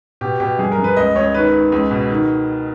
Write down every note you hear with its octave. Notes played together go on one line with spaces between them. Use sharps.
B2 G4
B2 G4
G2 G#4
A#4
G2
B4
C#2 D#5
C#2 C#5
D#3 B4
D#3
C#2
B2
D#3